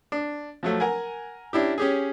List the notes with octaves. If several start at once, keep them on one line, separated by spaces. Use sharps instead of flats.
D4
F3 F#3 A3
A#4 F#5 G#5
C#4 D4 E4 G4
C#4 G4 G#4